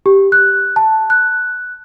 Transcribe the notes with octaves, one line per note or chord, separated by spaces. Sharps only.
G4
F#6
A5
F#6